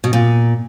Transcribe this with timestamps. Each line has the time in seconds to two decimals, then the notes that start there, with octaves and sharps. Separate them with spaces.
0.04 B2
0.13 A#2